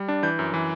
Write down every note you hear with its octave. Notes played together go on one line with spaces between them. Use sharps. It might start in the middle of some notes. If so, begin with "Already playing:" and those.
Already playing: G3
D4
E3 G6
F#2
E3